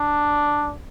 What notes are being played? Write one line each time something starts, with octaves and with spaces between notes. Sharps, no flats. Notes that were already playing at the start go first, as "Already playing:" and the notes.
Already playing: D4